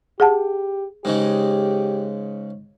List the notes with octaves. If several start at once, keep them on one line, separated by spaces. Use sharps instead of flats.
G4 G#4 F#5 A5
G#2 C#3 G#3 G4